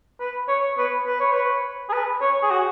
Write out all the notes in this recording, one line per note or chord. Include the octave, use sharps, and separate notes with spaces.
B4
C#5
B4
B4
C#5
B4
G#4
B4
C#5
G#4
F#4